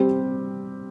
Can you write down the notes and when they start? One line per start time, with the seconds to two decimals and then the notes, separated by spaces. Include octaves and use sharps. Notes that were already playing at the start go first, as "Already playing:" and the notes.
Already playing: G3 C4 G4